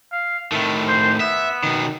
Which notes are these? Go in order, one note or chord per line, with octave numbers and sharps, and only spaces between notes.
F5
A2 D#3 A3
C5
B3 E5
B2 D#3